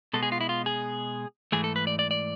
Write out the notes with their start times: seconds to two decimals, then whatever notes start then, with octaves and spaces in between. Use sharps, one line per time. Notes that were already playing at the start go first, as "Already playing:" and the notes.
0.13 B2 G#3 B3 A4
0.23 G#4
0.32 F4
0.41 E4
0.49 F4
0.66 G#4
1.52 G#2 E3 A3 G#4
1.64 A4
1.76 B4
1.87 D5
1.99 D5
2.11 D5